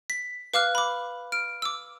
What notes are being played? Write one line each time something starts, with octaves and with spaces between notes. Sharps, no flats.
B6
B4 F5 D6 F6 F#6
B5 D6
F6 D7
D6 E6